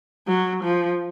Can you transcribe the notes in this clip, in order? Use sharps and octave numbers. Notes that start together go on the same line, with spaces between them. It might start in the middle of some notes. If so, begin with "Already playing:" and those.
F#3
F3